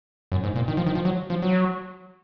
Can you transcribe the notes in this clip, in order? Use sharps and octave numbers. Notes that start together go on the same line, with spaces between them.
F#2
G#2
A#2
D#3
F3
D#3
F3
F#3
F3
F#3